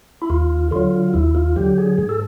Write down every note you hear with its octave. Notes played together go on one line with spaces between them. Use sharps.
E4
D#2 F4
D3 F#3 F4
D#2 E4
F4
D3 F#3 G4
G#4
G#2 G#4
A4